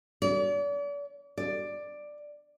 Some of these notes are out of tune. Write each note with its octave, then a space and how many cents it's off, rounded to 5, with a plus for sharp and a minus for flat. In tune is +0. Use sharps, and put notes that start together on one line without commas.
D5 -40
D5 +10